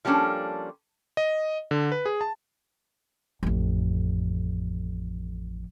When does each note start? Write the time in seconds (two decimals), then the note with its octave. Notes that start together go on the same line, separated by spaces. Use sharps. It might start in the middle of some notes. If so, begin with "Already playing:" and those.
0.05 F3 G3 A#3 C#4 D4 A4
1.17 D#5
1.71 D3
1.92 B4
2.06 G#4
2.21 A5
3.43 A1 F2